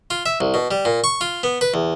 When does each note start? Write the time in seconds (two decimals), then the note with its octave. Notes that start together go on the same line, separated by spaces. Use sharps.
0.10 F4
0.26 E5
0.41 C2
0.54 B2
0.71 G3
0.85 A#2
1.04 C#6
1.21 F4
1.43 B3
1.61 B4
1.74 E2